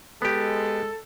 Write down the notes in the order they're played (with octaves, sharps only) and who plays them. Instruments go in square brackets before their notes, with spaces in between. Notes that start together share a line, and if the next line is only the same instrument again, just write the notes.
[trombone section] G#3 [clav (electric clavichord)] B3 G4 [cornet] A4